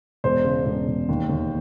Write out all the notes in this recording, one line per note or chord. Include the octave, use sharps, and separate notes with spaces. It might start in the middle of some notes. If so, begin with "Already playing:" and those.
E1 C5
C#3
E1
E1
D#2
D#2